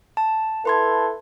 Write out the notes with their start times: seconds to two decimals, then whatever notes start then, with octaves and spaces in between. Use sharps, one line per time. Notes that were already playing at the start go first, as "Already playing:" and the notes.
0.17 A5
0.65 E4 A4 B4 C6 G#6